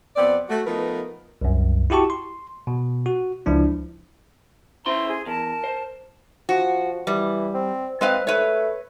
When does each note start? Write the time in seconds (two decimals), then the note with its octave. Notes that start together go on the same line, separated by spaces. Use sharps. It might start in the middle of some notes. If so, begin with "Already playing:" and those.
0.16 F2 B3 C4 D5
0.49 A3 F#4
0.66 F3 A3 B3 D#4 A#4 B4
1.41 C2 F#2
1.90 E4 F#4 G4 A5 C#6
2.10 C6
2.67 B2
3.06 F#4
3.46 C#2 F3 D4 E4
4.86 C#4 E4 C5 E5 A#5 C6
5.08 G#4
5.26 E2 A#4 A5
5.64 C5
6.49 F3 F#4
7.07 E3 G3
7.54 C4
8.01 G#3 C4 B4 F5
8.27 A3 B4 C#5